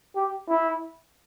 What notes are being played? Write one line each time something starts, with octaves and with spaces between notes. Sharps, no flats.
G4
E4